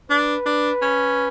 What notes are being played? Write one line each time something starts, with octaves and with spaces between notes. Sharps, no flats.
D4 B4
D4
C#4